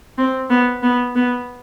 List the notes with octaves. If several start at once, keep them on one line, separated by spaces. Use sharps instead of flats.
C4
B3
B3
B3